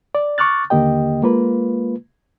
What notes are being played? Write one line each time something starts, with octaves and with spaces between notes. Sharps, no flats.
D5
C#6 D6 F6 F#6 A6
D#2 D3 A#3 G4 D#5 G5
G#3 A#3 F4 B4